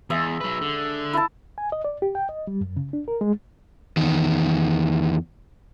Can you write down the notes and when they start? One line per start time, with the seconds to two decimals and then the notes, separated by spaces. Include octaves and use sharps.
0.10 E2 G#3 E5 D#6
0.41 F#3 B4
0.61 D3
1.13 E4 A5
1.58 G#5
1.72 D#5
1.84 D5
2.02 G4
2.15 G5
2.29 D#5
2.47 G3
2.61 F#2
2.77 C#3
2.93 D4
3.08 A#4
3.21 G#3
3.97 E2 D#3